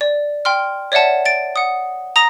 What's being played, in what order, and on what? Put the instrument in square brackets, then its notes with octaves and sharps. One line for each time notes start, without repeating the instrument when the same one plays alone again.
[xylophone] D5
G5 C6 F6
C#5 D5 E5 F#5 A5
A6 D7
F#5 D#6
A#5 D#6 A#6 F7